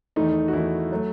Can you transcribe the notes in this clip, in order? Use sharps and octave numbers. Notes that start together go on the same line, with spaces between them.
E2 D#3 A3 D#4
F#4
E2 D#3 A3 E4
F#3 A3